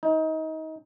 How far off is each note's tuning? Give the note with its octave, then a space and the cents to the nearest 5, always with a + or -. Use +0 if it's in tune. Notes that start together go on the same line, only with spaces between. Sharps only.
D#4 +25